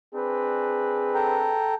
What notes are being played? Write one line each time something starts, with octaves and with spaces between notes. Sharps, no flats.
C4 D4 G#4 B4
A4 G5 A#5